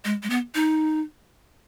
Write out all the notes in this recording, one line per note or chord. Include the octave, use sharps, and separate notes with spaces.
G#3
G#3
B3
D#4